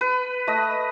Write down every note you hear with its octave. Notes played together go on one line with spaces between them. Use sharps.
B4
A3 D#5